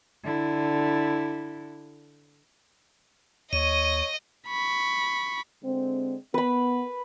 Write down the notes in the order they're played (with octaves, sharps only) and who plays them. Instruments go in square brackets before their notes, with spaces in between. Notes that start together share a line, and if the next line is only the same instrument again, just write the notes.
[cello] D3 E4
[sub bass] D#2 [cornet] C#5 [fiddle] D#5 [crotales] D#7
[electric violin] B5 C#6
[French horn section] D3 G#3 C4
[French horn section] B3 [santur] B4 B5